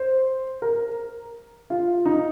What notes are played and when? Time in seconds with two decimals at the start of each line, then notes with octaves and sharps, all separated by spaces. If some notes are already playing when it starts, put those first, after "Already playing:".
Already playing: C5
0.62 A#4
1.70 F4
2.05 D#4